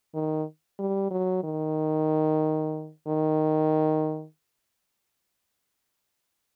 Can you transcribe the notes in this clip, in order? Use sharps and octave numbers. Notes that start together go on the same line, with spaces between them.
D#3
G3
F#3
D#3
D#3